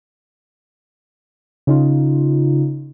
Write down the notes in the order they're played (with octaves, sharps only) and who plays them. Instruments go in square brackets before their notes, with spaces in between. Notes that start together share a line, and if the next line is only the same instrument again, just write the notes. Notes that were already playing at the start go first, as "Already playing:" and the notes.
[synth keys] C#3 D#4 F4